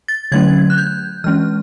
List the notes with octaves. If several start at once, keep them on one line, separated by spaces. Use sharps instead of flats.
A6
D3 F#3 A3 C#4 G#6
F#6
G6
E3 G#3 C#4 F6